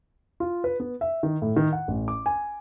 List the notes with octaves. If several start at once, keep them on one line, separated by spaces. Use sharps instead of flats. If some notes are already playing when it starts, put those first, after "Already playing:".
F4
B4
B3
E5
D#3
A2
D#3
F#5
A1
D6
G#5